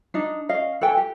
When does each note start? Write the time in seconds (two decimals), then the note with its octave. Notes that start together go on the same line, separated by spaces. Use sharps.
0.14 D4 D#4
0.49 C#4 D#5 F5
0.81 A4 B4 G5 G#5
0.97 G4